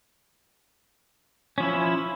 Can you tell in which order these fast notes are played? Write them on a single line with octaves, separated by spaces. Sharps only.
C#4 F3 E4